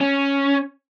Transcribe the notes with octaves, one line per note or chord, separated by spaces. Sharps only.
C#4